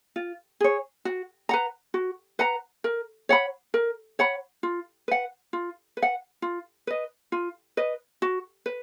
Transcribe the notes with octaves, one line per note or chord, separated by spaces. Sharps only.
F4
G#4 C#5
F#4
B4 F#5 A#5
F#4
B4 F#5 A#5
A#4
C#5 F#5 B5
A#4
C#5 F#5 B5
F4
B4 F#5
F4
B4
F#5
F4
B4 D#5
F4
B4 D#5
F#4
B4